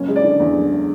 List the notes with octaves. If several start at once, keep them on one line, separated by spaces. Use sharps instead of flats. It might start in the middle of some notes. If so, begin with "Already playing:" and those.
Already playing: F#1 C#4
G#3
D5
D3
E2
F#1
G#3